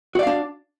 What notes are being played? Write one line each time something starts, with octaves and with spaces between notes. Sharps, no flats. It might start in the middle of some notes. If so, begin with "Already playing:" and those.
D4 F#4 D5 F5